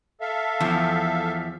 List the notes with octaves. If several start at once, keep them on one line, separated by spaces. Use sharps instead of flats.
A4 E5 F5
E2 F3